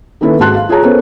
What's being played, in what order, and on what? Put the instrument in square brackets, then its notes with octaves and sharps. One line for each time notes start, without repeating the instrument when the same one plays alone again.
[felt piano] D#3 A#3 C#4 E4 A4 B4
G#1 G#3 F#4 A5 C6 F#6
F5
F4 G#4 C#5 A5 A#5
B3 C#4 A4 A#4 C5 C#5